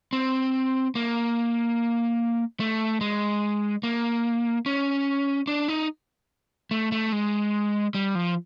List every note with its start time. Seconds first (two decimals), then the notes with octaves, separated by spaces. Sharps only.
0.13 C4
0.95 A#3
2.60 A3
3.01 G#3
3.83 A#3
4.66 C#4
5.47 D4
5.68 D#4
6.71 A3
6.92 A3
7.12 G#3
7.94 G3
8.15 F3